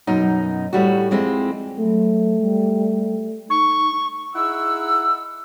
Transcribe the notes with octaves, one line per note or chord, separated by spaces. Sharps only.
F#2 B2 D#4
A2 G3 F#4
F2 G#3 C4 E4
F#3 A3
G3
D#4 C#6
D#4 E4 G#4 F#5 E6